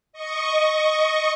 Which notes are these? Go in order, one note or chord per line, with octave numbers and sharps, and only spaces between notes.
D#5 C#6